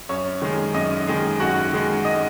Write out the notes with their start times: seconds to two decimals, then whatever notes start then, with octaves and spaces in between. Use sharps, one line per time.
0.09 F#2 C#5
0.42 D#3 G#3
0.74 F#2 D#5
1.07 D#3 G#3
1.40 F#2 F#4 F#5
1.73 D#3 G#3
2.05 D#5